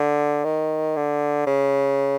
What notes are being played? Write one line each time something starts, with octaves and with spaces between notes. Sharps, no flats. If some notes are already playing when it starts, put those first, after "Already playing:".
Already playing: D3
D#3
D3
C#3